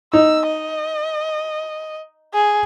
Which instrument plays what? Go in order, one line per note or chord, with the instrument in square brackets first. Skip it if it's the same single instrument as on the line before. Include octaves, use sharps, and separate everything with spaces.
[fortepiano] D#4 [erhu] E6
[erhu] D#5
G#4